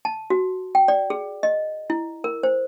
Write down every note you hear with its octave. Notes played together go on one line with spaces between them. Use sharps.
A5
F#4
G5
D5
G#4
D#5
E4
A#4
C5